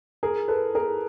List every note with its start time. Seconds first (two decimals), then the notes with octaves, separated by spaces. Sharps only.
0.23 G#4 A#4
0.48 A4 B4
0.75 G#4 A#4